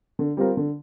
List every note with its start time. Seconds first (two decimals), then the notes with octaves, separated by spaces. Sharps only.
0.19 D3
0.37 G3 C4 F4 A#4
0.57 D3